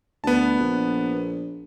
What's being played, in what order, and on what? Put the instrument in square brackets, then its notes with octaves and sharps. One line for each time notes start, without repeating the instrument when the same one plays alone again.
[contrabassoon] D2 [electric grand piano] B3 A5
[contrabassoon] A#1